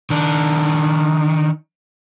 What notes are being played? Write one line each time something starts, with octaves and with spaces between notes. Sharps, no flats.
D#3 D4